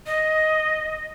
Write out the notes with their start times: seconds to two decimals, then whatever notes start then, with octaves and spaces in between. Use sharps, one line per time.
0.07 D#5